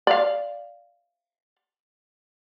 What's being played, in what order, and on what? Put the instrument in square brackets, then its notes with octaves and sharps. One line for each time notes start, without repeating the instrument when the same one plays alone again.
[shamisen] D5 F5